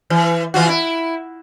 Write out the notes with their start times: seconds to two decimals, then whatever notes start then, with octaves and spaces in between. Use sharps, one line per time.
0.10 E3
0.54 E3 F4 F#4
0.69 E4